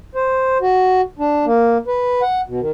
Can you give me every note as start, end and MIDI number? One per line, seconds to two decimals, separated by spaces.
0.15 0.58 72
0.61 1.01 66
1.19 1.45 62
1.46 1.78 58
1.87 2.22 71
2.22 2.41 78
2.48 2.60 47
2.60 2.71 51